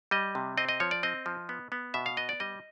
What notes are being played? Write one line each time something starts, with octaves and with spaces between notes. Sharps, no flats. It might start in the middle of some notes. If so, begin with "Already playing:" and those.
G3 D#5
C3
C4 D#5
D#5
F3 C#5
D5
C4 D#5
F3
B3
B3
B2 E5
F5
B3 D#5
D5
G3 D#5